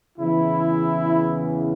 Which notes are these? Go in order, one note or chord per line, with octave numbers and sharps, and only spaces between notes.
E2 C#3 E3 E4